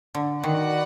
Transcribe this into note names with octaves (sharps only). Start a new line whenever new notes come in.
D3
D#3 F#4 B4 D5 F#5